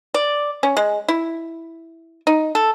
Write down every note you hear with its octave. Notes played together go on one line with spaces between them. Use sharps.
D5
C#4
G#3
E4
D#4
A4